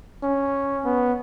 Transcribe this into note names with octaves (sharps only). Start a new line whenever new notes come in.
C#4
B3